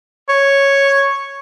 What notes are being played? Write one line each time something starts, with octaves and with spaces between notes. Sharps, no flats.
C#5